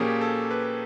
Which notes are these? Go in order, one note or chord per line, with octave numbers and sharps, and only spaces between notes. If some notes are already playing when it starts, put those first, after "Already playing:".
Already playing: A#2 F3 A#3 C#4 G4 G#4
A4
B4